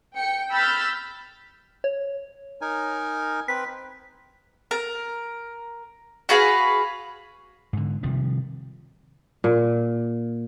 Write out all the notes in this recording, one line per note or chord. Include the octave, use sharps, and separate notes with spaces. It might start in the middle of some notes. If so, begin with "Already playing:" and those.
G5 C#7
B5 E6 F6 G6 A6 B6
C#5
D#4 A#4 G#5
C4 B4 B6
A#4
F#4 G#4 B4 F5
G#2 D3
C3 D#3 F3 G3
A#2